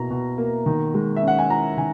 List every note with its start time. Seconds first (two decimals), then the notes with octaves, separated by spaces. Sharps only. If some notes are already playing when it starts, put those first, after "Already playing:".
Already playing: B2 A#3 E4 A#5
0.10 B2
0.38 A#3
0.66 D#3
0.94 G#3
1.16 E5
1.22 C#4
1.28 F#5
1.39 G#5
1.50 E4 A#5
1.77 D#3 G#5